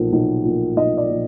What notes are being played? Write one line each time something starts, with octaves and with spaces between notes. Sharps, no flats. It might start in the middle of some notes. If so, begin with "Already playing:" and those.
Already playing: B1 A#2 F3
B1
A#2 F3
B1 D#5
D5
A#2 F3